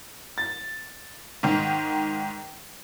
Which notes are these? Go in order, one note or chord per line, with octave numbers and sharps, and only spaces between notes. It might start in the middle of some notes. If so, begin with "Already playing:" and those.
A6
G#2 D#3